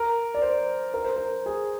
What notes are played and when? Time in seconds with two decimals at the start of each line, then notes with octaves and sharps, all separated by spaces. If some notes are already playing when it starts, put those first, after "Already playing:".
Already playing: A#4
0.34 D5
0.42 C5
0.94 A#4
1.04 C5
1.16 A#4
1.46 G#4